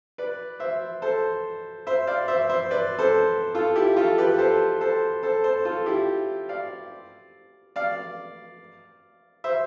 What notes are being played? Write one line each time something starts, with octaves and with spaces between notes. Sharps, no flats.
B4 D5
C5 E5
A4 C5
C5 E5
D5 F5
C5 E5
C5 E5
B4 D5
A4 C5
F4 A4
E4 G4
F4 A4
G4 B4
A4 C5
A4 C5
A4 C5
A4 C5
F4 A4
E4 G4
D5 F5
D5 F5
C5 E5